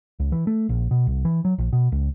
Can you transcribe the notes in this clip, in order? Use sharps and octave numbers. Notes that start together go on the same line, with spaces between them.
C#2
E3
A3
A#1
B2
C2
E3
F#3
A#1
B2
C#2